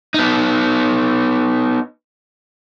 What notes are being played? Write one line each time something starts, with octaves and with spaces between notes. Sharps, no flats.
B3 D#4